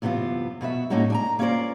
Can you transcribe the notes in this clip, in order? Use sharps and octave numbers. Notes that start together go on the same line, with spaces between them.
F#2 C3 E3 B3 F4
B2 B3 F#4 E5
A2 A#3 C#4 D#4 F#4
D4 G#5 A#5
A#3 C#4 F4 A#4 C5 D5